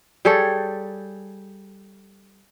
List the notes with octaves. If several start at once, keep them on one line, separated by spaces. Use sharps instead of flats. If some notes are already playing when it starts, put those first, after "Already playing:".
G3 G#4 A4 C#5